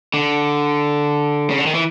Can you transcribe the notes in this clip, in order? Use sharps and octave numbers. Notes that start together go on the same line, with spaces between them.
D3
C#3
D3
D#3
E3